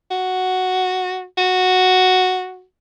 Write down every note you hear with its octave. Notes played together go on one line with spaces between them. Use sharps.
F#4
F#4